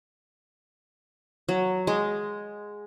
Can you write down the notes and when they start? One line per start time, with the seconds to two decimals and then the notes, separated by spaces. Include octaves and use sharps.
1.49 F#3
1.87 G#3